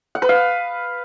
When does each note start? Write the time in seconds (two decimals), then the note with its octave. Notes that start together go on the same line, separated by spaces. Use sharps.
0.15 F#5
0.22 B4
0.29 F5